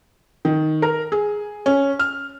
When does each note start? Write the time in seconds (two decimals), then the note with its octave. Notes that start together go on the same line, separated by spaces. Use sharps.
0.45 D#3
0.82 A#4
1.12 G#4
1.66 C#4
1.99 F6